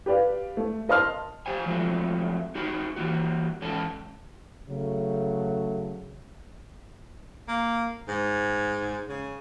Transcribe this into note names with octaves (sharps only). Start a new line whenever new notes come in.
G4 B4 D5 F5
A3
A#4 D#5 A5 C6 F6
G4 C5 G#5
F3 F#3 G#3 A3 C4
D#4 F#4 G#4 A#4
E3 G3 A#3 F#4
E2 G#2 C#4 A4 A5
C#3 F#3 A3
A#3
G#2
C#3